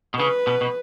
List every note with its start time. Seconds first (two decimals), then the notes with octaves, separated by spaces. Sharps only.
0.14 B2
0.19 C#3 B4
0.47 B2
0.61 B2